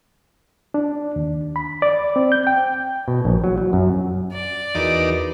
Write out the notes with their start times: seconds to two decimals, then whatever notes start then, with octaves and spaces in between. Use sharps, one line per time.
0.74 D4
1.16 D#2
1.56 B5
1.82 D5
2.16 C4
2.32 G6
2.47 G5
3.08 B2
3.25 A#1
3.44 F#3
3.58 F#3
3.73 F#2
4.32 D5
4.75 E2 D#4 F#4 A#4 B4 D6